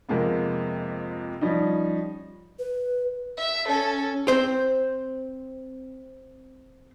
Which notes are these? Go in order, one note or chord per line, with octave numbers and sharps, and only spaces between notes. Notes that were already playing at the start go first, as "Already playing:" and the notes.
F2 C3 G#3 A#3 B3
F3 G3 C#4 D#4
B4
E5
C#4 A4
C4 C5